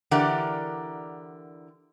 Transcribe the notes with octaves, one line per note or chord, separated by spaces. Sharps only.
D3 E3 G4 A#4 D5 F#5